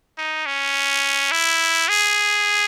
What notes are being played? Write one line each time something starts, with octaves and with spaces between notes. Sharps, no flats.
D#4
C#4
E4
G#4